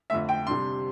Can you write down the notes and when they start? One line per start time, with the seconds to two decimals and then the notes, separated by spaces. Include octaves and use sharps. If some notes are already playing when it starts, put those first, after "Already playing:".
0.10 F2 D3 A3 E5
0.29 G5
0.47 C3 G3 D4 C6